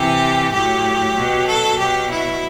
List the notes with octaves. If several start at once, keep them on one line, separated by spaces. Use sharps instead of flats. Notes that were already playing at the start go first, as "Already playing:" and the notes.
Already playing: C3 E3 G4
A2 F#3 G4
B2 F#3
A4
B2 F#3 G4
E4